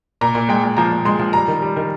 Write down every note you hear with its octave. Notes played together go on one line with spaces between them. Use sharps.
A#2 A#5
A#2
G#3 G5
A#2
F3 A#5
A#2
G#3 C6
F3
G3 A#5
D#3
G3
D#3